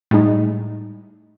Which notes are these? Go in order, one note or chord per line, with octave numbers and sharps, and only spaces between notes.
A2 G3 G#3 D#4